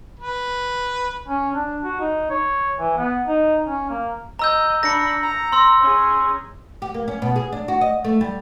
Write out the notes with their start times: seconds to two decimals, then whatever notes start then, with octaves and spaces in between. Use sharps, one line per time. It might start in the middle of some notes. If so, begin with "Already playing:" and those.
0.19 B4
1.28 C#4
1.54 D4
1.84 F#4
2.00 D#4
2.30 C#5
2.78 E3
2.97 B3
3.27 D#4
3.67 C#4
3.90 A#3
4.39 D#5 A#5 E6 G6
4.83 D4 B5 A#6 C#7
5.23 A#5
5.52 C6 E6
5.81 C#4 G#4
6.82 G4
6.94 A#3
7.08 C#4
7.22 B2
7.36 G#4
7.52 D4
7.68 F#4
7.81 D#5
8.04 A3
8.21 G3